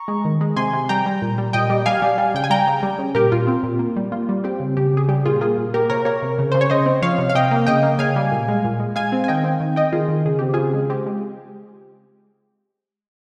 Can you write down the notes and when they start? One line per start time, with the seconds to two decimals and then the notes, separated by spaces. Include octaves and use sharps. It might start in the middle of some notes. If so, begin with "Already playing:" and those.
Already playing: A#5 C#6
0.08 G#3
0.25 D#3
0.41 G#3
0.56 C3 G#5 C6
0.73 C3
0.89 G3 G5 A#5
1.06 G3
1.22 A#2
1.38 G3
1.53 A#2 D#5 G5
1.70 G3
1.86 G3 F5 G#5
2.02 G3
2.18 G3
2.34 C#3 G5
2.44 G#5
2.50 G3 G5 A#5
2.67 C#3
2.83 G3
2.99 C#3
3.15 A#2 G4 A#4
3.32 A#2 F4
3.47 C4
3.63 A#2
3.79 A#3
3.96 G3
4.12 A#3 F4
4.29 G3
4.44 C4 G4
4.60 C#3
4.77 C#3 G4
4.93 C#3 G#4
5.08 G3 G4
5.25 A#2 F4 G#4
5.41 A#3 F4 G#4
5.58 A#2
5.74 A#3 G4 A#4
5.90 C3 A#4 C#5
6.05 A#3 A#4 C#5
6.22 C3
6.39 C#3
6.52 C#3 C5
6.61 C#5
6.70 C#3 C5 D#5
6.86 C4
7.02 F3 C#5 F5
7.18 C3
7.29 F5
7.35 C3 D#5 G5
7.51 A#3
7.67 C#3 D#5 G5
7.83 A#3
7.99 C#3 F5 G#5
8.16 G3
8.31 A#2
8.48 G#3
8.65 A#2
8.80 G#3
8.96 G#3 F5 G#5
9.12 C4
9.24 G#5
9.28 D#3 D#5 G5
9.44 C4
9.60 D#3
9.76 C4 D#5 G5
9.92 D#3 F4 G#4
10.09 D#3
10.25 C#3 G#4
10.39 C4 G4
10.54 C#3 F4 G#4
10.73 G#3
10.90 C4 G4
11.06 G#3